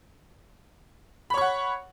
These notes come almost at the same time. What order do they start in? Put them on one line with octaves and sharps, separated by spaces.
B5 C#5 C#6 F#5